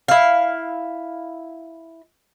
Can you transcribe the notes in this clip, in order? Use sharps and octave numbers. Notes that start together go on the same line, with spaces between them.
E4 F5